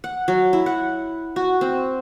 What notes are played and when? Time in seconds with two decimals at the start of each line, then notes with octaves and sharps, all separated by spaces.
0.04 F#5
0.28 F#3
0.53 E4
0.66 F#5
1.36 F#4
1.61 C4